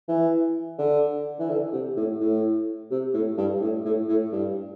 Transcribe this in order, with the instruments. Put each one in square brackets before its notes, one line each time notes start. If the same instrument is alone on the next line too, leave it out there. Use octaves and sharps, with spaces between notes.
[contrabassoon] E3
D3
E3
D3
C3
A2
A2
C3
A2
G2
A2
A2
A2
G2